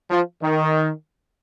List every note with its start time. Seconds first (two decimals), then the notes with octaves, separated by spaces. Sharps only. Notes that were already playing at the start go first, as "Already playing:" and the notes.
0.11 F3
0.42 D#3